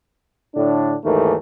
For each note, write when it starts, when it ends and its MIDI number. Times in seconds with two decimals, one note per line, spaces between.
0.56 0.96 45
0.56 0.96 50
0.56 0.96 62
1.04 1.35 39
1.04 1.35 44
1.04 1.35 52
1.04 1.35 57
1.04 1.35 70